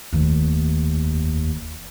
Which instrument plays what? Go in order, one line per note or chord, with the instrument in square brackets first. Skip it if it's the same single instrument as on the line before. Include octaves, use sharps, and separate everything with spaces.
[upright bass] F1 D#3 [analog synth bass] D#2